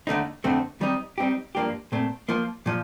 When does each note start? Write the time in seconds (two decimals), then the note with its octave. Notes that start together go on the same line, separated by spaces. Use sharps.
0.07 D#2 D3 A3 D#4
0.44 F2 D3 A3 C4
0.81 D#3 G3 C4 D#4
1.18 G3 C4 D#4 G4
1.55 G2 F3 A#3 D4 G4
1.92 A#2 A3 C4
2.29 F3 A#3 F4
2.66 A#2 F3